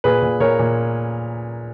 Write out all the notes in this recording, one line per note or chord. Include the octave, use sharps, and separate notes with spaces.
A#2 G#4 B4
A#2
A#2 A#4 C#5
A#2